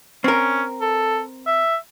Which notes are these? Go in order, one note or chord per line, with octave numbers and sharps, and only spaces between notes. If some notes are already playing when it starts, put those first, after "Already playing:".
C4 C#4 A#4
A4
E5